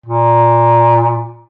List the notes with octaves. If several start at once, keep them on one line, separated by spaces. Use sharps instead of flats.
A#2